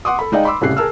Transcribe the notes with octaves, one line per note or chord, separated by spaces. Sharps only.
F#5 C6 D6 D#6
A4 B5
G#3 D#4 D5 D#5 F5 G5
B5 C6 D6 E6
C2 A2 C#3 G4 F#6 C7
G#4 A#4 A5 E6 F6